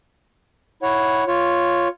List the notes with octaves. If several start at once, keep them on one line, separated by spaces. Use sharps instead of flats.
E4 C#5 F#5
F4 C#5